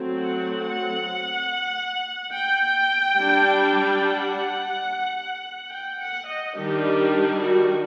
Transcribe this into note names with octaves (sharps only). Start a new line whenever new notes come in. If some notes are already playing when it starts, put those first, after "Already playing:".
Already playing: F#3 A3 C4
F#5
F#5
G5
G3 D4
F#5
G5
F#5
D#5
D#3 G3 D4 G4
F#4